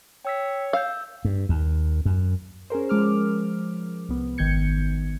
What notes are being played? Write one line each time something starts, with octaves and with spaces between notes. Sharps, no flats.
C#5 G5 E6 B6
F5 E6 G6
G2
D#2
F#2
C#4 G#4 A#4 C5
F3 G#3 D6 F6
C2 B3
G#1 D#3 G6 G#6 C#7